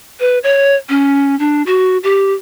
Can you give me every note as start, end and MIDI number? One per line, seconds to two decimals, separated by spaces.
0.20 0.38 71
0.43 0.75 73
0.89 1.37 61
1.39 1.62 62
1.66 1.97 66
2.03 2.33 67